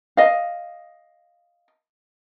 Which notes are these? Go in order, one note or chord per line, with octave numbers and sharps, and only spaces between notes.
D#5 F5